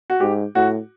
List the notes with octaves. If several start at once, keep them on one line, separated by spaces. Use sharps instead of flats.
F#4
G#2 G4
A2 F#4